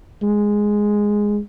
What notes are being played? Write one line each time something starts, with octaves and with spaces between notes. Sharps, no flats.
G#3